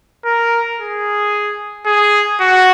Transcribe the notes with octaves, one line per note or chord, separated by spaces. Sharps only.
A#4
G#4
G#4
F#4